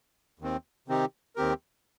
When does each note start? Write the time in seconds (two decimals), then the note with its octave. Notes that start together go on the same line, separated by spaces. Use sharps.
0.39 D#2 D#3 C4
0.88 C3 D#3 C4 D#4 G4
1.36 D#2 D#3 C4 G4 A#4